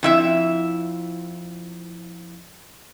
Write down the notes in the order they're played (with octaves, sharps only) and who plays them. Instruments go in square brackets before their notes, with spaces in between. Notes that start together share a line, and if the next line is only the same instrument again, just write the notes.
[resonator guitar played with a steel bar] F2 E4 E5